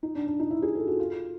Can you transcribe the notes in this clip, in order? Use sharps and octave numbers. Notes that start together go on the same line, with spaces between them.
D#4
D4
D4
D#4
E4
G#4
A4
F#4
F4